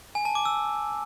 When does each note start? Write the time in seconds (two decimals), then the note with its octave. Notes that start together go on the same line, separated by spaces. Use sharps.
0.15 G#5
0.25 A5
0.35 D6
0.45 E6